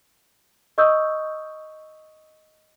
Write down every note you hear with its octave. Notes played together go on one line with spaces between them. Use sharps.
D#5 C#6 D#6 E6 G6